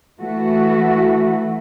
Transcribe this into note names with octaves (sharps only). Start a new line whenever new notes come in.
E3 A3 F#4